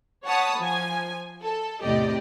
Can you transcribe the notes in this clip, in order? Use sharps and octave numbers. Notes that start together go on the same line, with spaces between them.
C#5 F#5 A5 B5 D#6
F3 G#5
A4
E2 A2 C3 G4 D5 D#5